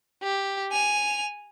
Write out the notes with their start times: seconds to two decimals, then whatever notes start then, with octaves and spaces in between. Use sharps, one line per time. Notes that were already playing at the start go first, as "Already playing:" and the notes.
0.23 G4
0.72 G#5 F7